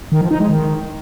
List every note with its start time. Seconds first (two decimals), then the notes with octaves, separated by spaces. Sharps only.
0.12 D#3
0.21 F3
0.31 D#4
0.40 G#3
0.49 D#3